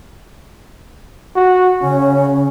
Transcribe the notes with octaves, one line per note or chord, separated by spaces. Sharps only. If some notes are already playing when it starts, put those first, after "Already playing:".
F#4
C#3 C#4